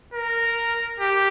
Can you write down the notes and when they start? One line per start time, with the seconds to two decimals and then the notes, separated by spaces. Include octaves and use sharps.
0.13 A#4
1.00 G4